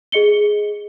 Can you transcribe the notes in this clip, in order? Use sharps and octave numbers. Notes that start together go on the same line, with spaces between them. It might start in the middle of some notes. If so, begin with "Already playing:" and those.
G#4 D#5 C#7 G7